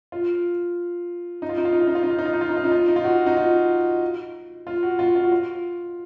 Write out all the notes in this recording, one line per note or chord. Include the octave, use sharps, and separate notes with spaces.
F4
D#4
F4
D#4
F4
D#4
F4
D#4
F4
D#4
F4
D#4
F4
D#4
F4
D#4
F4
D#4
F4
D#4
F4
F#4
D#4
F4
F4
F#4
F4
F4
F#4
F4